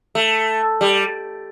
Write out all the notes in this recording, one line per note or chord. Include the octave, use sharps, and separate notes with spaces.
A3
G3